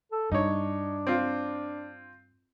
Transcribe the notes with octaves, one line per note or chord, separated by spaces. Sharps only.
A4
G2 D4 D#4 C#5
C4 F4